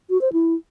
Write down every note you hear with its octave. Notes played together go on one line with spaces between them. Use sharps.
F#4
C5
E4